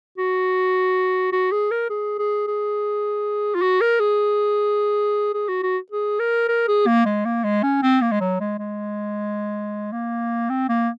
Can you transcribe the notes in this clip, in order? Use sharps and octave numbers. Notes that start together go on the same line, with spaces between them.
F#4
F#4
G#4
A#4
G#4
G#4
G#4
F4
F#4
A#4
G#4
G#4
F#4
F#4
G#4
A#4
A#4
G#4
A#3
G#3
A#3
G#3
C#4
C4
A#3
G#3
F#3
G#3
G#3
A#3
C4
A#3